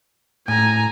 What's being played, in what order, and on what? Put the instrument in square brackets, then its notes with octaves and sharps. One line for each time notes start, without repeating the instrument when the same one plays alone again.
[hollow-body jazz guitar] A2 [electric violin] G#5 A#5